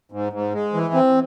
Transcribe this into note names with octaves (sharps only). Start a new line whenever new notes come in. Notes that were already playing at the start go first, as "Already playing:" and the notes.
G#2
G#2
G#3
E3
C4